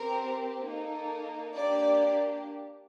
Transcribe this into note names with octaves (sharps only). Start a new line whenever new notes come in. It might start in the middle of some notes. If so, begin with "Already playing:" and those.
Already playing: C4 G4 A#4
A#3 D#4 A4
A#3 D4 G4 D5